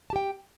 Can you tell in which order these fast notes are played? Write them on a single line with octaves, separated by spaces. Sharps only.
A5 G4 G5